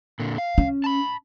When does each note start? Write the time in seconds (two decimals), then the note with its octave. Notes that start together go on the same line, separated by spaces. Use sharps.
0.19 A#2 D3
0.38 F5
0.58 C#4
0.84 A5 B5